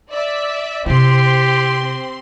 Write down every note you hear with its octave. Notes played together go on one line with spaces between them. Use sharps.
D5 E5
C3 C4 E4 G4 C6